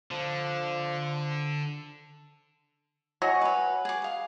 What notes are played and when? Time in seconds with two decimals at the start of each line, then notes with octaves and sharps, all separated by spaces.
0.11 D3 F3
3.22 F#3 D#5 F#5 G#5 C#6
3.41 B4 C#5
3.85 G#4 D6
4.02 F5 D#6